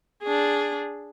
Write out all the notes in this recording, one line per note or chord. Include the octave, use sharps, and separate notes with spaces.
D4 G#4